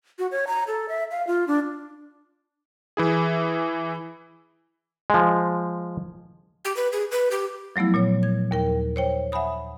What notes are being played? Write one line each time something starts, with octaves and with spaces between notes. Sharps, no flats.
F#4
C#5
A#5
A4
E5
F5
F4
D4
E3 E4 G#4
F3 G#3
G4
B4
G#4
B4
G4
F3 F#3 A3 B3 E4
A#2 F#3 C#5
G#6
D#2 A#4 G5
C5 C#5 G5
E5 F#5 G#5 B5 D#6